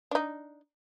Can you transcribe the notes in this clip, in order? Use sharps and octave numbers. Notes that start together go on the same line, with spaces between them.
D4 D#4